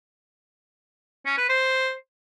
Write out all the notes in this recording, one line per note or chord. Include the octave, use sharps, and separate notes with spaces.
C#4
B4
C5